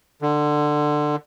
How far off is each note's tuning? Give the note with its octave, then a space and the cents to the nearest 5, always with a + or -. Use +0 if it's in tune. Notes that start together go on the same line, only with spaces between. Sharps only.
D3 +20